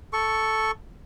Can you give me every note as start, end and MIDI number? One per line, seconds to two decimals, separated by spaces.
0.13 0.71 69
0.13 0.71 85